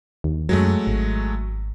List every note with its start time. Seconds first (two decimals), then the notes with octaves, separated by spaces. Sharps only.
0.24 D#2
0.49 F#2 F#3 G#3 A3
0.87 G#1